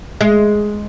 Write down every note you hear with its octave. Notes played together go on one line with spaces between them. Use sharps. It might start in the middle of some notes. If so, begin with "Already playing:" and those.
G#3